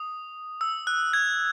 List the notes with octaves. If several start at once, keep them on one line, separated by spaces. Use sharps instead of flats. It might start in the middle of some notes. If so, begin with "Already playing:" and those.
Already playing: D#6
E6
F#6
G#6